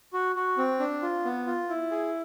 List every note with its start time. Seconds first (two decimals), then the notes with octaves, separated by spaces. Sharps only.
0.13 F#4
0.36 F#4
0.58 C4
0.80 D4
1.02 F4
1.25 B3
1.47 F4
1.69 E4
1.91 G#4